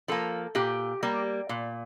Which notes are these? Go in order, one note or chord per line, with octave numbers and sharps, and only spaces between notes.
F3 A#3 A4
A#2 G4
G3 A#3
A#2